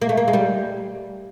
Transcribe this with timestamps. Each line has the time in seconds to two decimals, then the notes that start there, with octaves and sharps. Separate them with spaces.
0.02 A#3
0.09 A3
0.17 A#3
0.28 G#3
0.33 G3